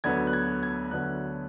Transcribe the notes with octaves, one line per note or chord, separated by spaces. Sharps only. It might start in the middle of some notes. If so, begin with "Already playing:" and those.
D2 D3 F#3 B3 G#6
F#6
G#6
G#6
D2 D3 F#3 B3 F#6